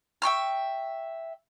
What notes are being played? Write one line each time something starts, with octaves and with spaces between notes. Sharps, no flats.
E5 G5 C#6 F6